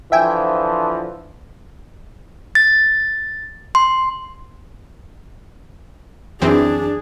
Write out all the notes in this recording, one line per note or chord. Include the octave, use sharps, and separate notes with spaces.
D3 E3 F3 E5 G5 G#5
A6
C6
F#2 E3 C4 D4 G#4